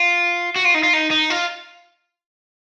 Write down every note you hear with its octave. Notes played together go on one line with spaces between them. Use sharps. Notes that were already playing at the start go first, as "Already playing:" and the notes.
Already playing: F4
F#4
F4
D#4
F4
D#4
D#4
F4